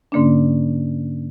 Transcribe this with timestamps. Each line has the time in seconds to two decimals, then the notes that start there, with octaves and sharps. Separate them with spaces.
0.12 G#2 D3 A#3 C#4 D4